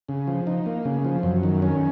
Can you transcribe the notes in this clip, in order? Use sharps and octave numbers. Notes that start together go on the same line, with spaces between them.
C#3
F3
D#4
A#3
C#3
F3
F#2
D#3
C#4